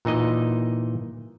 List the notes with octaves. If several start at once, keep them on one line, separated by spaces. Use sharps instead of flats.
A#2 E3 D#4 D#5